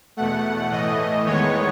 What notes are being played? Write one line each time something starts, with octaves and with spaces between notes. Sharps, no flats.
E2 B2 A3 F#5
A2 E3 A3 D#5
E2 D#3 G#3 B3 C#5